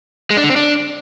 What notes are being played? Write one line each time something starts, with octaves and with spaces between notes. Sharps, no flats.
G#3
D4
D3
C4
D4